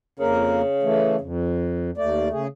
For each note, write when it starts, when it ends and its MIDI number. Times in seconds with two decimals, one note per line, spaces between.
0.20 0.62 41
0.20 1.28 49
0.20 0.62 58
0.20 0.62 70
0.83 1.16 52
0.83 1.16 57
1.21 1.91 41
1.98 2.29 39
1.98 2.44 57
1.98 2.29 74
2.32 2.47 49
2.32 2.47 68